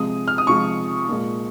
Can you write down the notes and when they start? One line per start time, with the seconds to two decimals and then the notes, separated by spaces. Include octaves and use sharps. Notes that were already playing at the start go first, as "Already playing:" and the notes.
Already playing: C3 F3 G#3 D#6
0.28 F6
0.38 D#6
0.47 C3 F3 G#3 C#6
1.09 A#2 G#3